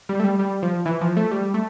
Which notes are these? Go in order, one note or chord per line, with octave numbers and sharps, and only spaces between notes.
G3
A3
G3
G3
F3
E3
F3
A3
G3
A3